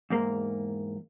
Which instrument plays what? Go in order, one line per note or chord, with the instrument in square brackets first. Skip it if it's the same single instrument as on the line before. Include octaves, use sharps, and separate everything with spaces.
[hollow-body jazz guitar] E2 G#2 A#3